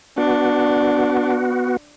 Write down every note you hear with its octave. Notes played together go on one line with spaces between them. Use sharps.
B3 D4 F#4